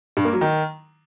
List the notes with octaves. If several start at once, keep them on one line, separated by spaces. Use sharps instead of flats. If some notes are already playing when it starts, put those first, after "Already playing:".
G2
A#3
F#3
D#3